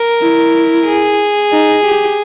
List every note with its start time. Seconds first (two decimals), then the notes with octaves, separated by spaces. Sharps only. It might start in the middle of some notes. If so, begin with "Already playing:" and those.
Already playing: A#4
0.20 E4
0.86 G#4
1.52 D#4
1.84 G4